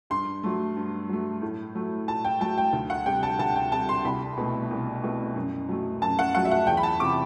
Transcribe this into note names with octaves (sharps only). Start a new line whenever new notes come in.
G2 C6
F#3 A3
G2
F#3 A3
A2
F#3 A3
A2 A5
G5
F#3 A3 A5
G5
D2
F#5
C3 G3 G5
A5
D2 A5
G5
C3 G3 A5
C6
C2 B5
B2 A3
C2
B2 A3
F#2
F#3 A3
F#2 A5
F#5
F#3 A3 F#5
E5
F#5
E2 G5
B5
A5
C3 E3 D6